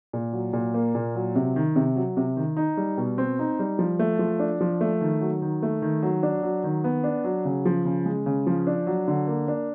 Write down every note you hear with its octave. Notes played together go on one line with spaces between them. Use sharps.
A#2
F#3
A#2
A#3
A#2
F#3
C3
D#3
C3
F#3
C3
D#3
D#4
G3
B2
C4
D#4
G3
F3
A3
F3
D4
F3
A3
D#3
F#3
D#3
A3
D#3
F#3
D4
F#3
D#3
B3
D4
F#3
C#3
F3
C#3
G#3
C#3
F3
D4
F#3
D3
A#3
D4